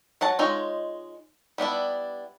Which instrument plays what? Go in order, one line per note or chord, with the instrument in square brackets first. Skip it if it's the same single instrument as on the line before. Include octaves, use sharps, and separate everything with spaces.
[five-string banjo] F#3 F#5 A5
G#3 D#4 F4 C#5
G3 B3 D4 E4